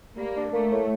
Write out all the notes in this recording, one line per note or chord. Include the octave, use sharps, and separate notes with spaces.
G3 A#3
D4
A3 A#3
A2